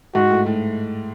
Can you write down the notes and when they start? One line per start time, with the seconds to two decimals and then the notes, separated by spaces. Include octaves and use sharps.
0.15 G#2 F#4
0.30 A2
0.46 A2